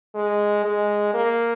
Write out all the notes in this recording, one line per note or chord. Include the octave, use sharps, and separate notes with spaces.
G#3
G#3
A#3